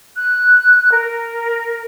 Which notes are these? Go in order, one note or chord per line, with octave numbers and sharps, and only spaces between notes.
F#6
A#4